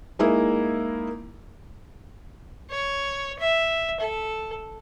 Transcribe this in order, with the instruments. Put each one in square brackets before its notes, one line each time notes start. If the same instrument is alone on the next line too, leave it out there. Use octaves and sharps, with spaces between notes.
[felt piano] G#3 A#3 D#4 E4
[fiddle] C#5
E5
A4